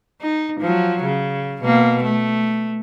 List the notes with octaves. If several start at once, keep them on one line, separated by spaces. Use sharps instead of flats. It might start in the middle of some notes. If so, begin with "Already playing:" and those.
D#4
F3 F#3
C#3
B2 A#3
A3